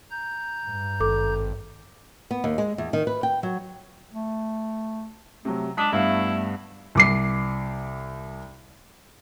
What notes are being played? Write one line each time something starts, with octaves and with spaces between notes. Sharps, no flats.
A#5 G6
G2
G#1 A4 D6
B3
D#2
G#3
E2
D#3
B4
G5
F#3
A3
C3 F#3 A3
G#3 D4 D#6 B6
G2 A3 B3 E4 F5
C2 D6 C7